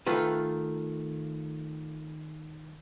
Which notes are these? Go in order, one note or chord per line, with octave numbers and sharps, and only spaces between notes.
D#3 A3 F4 B4